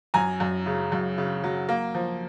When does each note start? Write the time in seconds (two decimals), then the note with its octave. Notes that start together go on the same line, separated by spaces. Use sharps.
0.14 F#2 G#5 A#5
0.40 F#2
0.66 C#3
0.92 F#2
1.18 C#3
1.44 F#3
1.69 A#3
1.94 F3